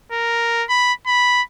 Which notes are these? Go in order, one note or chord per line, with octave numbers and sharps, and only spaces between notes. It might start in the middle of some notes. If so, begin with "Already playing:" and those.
A#4
B5
B5